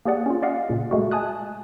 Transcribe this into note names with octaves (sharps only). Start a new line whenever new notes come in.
A#3 G4 G#4 D5 F#5
C#4 F4
D5 D#5 F5 F#5
A#2 C#3
G#3 A3 F#4
G#5 A5 D#6 F#6